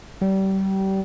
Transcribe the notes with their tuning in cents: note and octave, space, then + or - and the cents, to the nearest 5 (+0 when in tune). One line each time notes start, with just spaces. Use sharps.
G3 -30